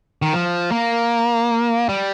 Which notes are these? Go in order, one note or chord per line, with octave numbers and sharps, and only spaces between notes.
D#3
F3
A#3
G3